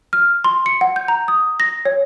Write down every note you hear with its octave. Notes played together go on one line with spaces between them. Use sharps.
F6
C6
C#7
F#5
G6
A#5
D#6
A#6
C#5